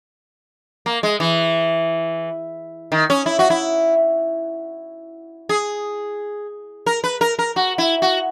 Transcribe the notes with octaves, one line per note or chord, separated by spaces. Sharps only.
A#3
G#3
E3
D#3
C#4
E4
F#4
E4
G#4
A#4
B4
A#4
A#4
F#4
E4
F#4